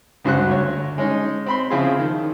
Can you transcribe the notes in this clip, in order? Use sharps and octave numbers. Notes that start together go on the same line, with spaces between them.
C#2 G2 F#4 C5 F#6
D2 C#5
G#3 C#4 D#4
C4 B5 C6
C#3 F3 C4 E4 F4 G#4
D#3